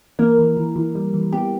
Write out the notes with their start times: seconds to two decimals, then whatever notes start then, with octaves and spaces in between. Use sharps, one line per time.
0.19 E3 A#3 A#4
0.39 E3
0.57 E3
0.76 E3
0.95 G3
1.14 E3
1.33 B3 G4